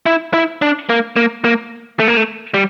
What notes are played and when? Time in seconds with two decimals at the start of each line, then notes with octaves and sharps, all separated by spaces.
0.06 E4
0.34 E4
0.62 D4
0.89 A#3
1.16 A#3
1.44 A#3
2.00 A3
2.08 A#3
2.17 A3
2.54 G3